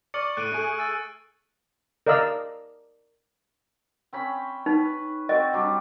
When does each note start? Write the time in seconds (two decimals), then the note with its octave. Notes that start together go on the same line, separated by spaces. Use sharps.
0.14 D5 C#6 F6 C#7
0.37 A2 F#6 D7 D#7
0.52 A3 G#4
0.78 E6 A6
2.07 A#4 D5 D#5 F5 E6
4.13 C4 C#4 B5
4.66 D#4 B4
5.29 C4 F#4 D#5
5.53 F#3 G3 D4